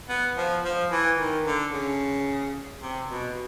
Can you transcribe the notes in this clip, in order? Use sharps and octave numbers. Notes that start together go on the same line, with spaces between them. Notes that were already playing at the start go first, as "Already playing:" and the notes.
B3
F3
F3
E3
D#3
D3
C#3
C3
B2